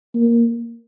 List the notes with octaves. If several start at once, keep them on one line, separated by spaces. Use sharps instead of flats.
A#3